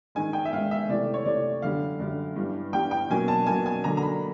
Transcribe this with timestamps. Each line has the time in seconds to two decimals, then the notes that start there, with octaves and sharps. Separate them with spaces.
0.15 G#2 D#3 G#3 G#5
0.33 G5
0.45 E5
0.53 G#2 D#3 G#3 F5
0.71 E5
0.89 C3 E3 A3 D5
1.14 C#5
1.25 C3 E3 A3 D5
1.62 F#2 D3 G3 F5
1.99 F#2 D3 G3
2.36 G2 E3 G3
2.73 G2 E3 G3 G5
2.91 G5
3.10 B2 F#3 A#3 C#4 G#5
3.28 A5
3.46 B2 F#3 A#3 C#4 G#5
3.66 G#5
3.84 D3 F#3 A#3 A#5
3.97 A#5
4.02 B5